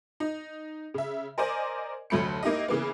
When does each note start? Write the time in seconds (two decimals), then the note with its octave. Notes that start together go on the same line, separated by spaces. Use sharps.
0.20 D#4
0.94 C#3 E5
1.38 A#4 C5 D5 D#5 G#5
2.10 F1 D2 F#3 A3 B5 C#7
2.43 A#3 D#4 E4 G4 D#5
2.68 C#3 E3 A#3 B3